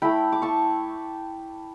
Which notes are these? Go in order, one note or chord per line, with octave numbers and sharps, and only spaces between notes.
A3 E4 G5 B5
D6
A5 C#6